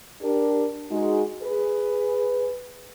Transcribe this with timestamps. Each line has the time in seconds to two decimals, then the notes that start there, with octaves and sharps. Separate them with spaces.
0.22 D4 G4 A#4
0.91 G#3 D#4 F#4
1.43 G#4 B4